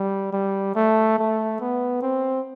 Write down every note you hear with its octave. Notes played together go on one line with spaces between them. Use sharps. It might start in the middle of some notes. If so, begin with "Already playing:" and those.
Already playing: G3
G3
A3
A3
B3
C4